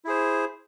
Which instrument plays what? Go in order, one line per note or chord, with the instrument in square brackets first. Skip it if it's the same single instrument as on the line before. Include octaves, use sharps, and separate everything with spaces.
[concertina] E4 G#4 C5